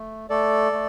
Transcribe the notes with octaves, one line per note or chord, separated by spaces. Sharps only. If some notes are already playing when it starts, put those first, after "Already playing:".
Already playing: A3
A3 A4 D5
A3